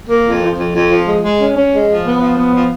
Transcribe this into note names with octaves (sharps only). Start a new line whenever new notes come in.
A#3
F2
F3
F2
F2
F3
G#3
G#3
C#4
C#4
G#3
F3
B3
F3
B3
F3